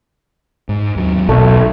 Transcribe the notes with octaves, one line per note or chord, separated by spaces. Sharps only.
G#2
D#2 F#3
B1 A3